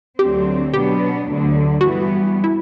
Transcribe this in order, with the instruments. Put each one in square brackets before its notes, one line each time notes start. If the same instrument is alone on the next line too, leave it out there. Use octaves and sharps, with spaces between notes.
[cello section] D2 D3 F#3 C4 [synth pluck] G4
[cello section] B2 F#3 B3 D4 [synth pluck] G4
[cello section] D2 D3 F#3
[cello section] G2 E3 G3 B3 [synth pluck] F#4
[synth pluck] E4